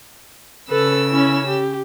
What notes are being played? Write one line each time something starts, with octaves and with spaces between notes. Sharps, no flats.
C#3 A4 B4 E6
C#4 E4
G4